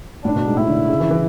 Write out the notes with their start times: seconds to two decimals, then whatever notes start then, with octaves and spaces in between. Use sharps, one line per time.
0.24 A2 D4
0.36 B2
0.47 G#2
0.57 A2 E4
0.67 D3
0.89 C#3
1.00 E3
1.10 E3